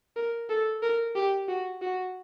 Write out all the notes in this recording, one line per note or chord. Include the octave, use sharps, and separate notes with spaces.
A#4
A4
A#4
G4
F#4
F#4